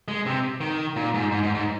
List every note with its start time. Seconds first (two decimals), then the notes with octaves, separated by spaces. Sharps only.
0.08 G#3
0.26 C3
0.61 D#3
0.96 A#2
1.14 G#2
1.31 G#2
1.43 G#2
1.54 G#2